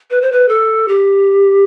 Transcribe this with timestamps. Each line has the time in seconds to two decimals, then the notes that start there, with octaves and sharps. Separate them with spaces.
0.10 B4
0.22 C5
0.32 B4
0.49 A4
0.88 G4